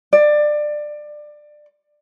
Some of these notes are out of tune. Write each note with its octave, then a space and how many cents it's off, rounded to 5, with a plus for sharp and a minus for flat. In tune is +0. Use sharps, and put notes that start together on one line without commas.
D5 +20